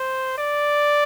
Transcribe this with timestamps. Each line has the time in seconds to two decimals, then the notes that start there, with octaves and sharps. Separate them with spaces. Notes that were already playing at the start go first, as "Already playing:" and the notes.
Already playing: C5
0.38 D5